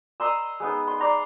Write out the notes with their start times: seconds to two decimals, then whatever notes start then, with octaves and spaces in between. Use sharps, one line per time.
0.20 D#5 A#5 C6 E6
0.60 G#3 B3 D#4
0.87 C6
1.00 D5 A#5 C6